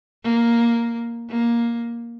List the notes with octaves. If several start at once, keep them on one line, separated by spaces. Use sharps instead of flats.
A#3
A#3